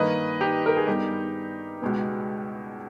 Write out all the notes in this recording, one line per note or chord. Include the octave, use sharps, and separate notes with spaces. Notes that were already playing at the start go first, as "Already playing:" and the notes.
Already playing: G2 D#3 A#3 B4 D#5
D#4 G4
A#4
G#4
G2 G3 B3 D#4 G4
C#2 B2 G#3 B3